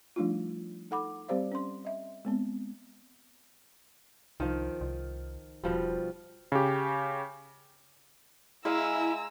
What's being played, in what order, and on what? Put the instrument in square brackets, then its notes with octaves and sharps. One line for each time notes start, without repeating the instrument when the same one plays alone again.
[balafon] F3 G3 A3 D4 D#4 F4
D#4 A4 F#5 B5 D6
G3 C4 G4 C5 D5 F5
C#4 C6
D#5 E5
G#3 B3 C4
[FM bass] C2 [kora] D#3 F3
[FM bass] C2
[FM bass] E1 [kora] B2 F3 G3
[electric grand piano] C#3 G4
[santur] G#3 F5 G#5 [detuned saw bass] E4 [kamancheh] A#5 E6